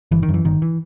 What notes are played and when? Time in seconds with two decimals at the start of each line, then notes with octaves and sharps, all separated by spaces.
0.11 G1 E3
0.23 D#3
0.29 F#2
0.34 E3
0.45 G1 D#3
0.62 E3